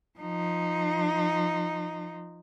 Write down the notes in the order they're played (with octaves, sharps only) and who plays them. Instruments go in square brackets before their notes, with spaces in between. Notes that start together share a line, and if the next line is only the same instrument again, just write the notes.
[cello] F3 D#4